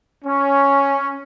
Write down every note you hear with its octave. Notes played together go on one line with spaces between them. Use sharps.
C#4